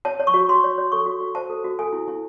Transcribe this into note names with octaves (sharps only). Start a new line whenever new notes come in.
C#5 A5
C#5
C#6
F#4
F#4 C6
C#5
C#5
A4 C#6
F#4
F#4
C5 A5
A4
F#4
A4 G#5
E4
E4